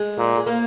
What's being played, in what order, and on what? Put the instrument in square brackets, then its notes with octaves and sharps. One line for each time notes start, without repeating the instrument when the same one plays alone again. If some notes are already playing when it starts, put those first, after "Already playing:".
Already playing: [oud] G#3
[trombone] A#2
[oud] G#3
A#3